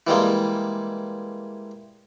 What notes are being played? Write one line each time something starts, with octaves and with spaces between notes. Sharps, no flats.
E3 G3 G#3 A#3